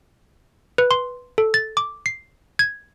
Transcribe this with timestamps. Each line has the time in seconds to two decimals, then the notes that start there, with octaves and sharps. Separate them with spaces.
0.78 B4
0.91 C6
1.38 A4
1.54 A6
1.77 D6
2.06 C7
2.59 G#6